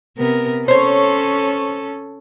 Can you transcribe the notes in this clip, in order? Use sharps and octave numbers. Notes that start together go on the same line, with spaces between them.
C3 B3 A#4
C#4 A4 C5 C#5